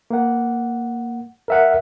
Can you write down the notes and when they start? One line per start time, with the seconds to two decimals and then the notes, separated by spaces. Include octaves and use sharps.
0.10 A#3 F#5
1.48 A#4 E5 F#5